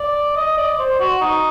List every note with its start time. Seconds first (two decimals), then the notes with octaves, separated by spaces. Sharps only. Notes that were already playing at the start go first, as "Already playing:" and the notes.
Already playing: D5
0.36 D#5
0.58 D5
0.79 C5
1.00 F#4
1.21 D#4